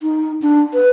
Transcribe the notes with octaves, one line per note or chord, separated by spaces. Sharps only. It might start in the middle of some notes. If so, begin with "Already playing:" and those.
D#4
D4
B4